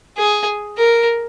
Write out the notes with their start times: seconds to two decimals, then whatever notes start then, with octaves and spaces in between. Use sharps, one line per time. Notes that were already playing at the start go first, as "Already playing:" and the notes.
0.18 G#4
0.78 A#4